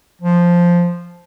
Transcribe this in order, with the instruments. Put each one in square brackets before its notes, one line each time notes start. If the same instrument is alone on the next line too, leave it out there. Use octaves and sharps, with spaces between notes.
[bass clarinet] F3